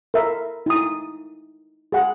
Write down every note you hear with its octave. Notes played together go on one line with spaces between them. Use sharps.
A#4 E5
D#4 E4 D#6
G#4 F#5